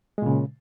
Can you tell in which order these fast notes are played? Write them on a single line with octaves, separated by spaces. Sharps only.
G#3 A#2 C#3